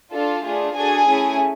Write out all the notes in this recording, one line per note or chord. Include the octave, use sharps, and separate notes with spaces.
D4 F4 A4
A3 D4 F4 G#4
D4 F#4 G#4 A4 G#5
A3 C#4 E4